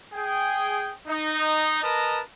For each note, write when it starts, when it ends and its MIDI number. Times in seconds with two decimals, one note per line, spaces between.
0.14 0.93 68
0.14 0.93 79
1.08 1.81 63
1.83 2.21 70
1.83 2.21 71
1.83 2.21 75
1.83 2.21 81
1.83 2.21 82